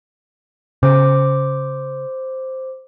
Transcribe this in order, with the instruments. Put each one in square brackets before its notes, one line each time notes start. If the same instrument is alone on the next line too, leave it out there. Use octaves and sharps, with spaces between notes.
[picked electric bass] C#3 [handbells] C5 D6